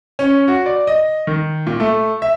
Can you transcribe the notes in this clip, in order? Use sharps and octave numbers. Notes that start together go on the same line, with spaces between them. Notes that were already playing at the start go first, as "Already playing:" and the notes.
C#4
F#4
D5
D#5
D#3
A#2
A3
E5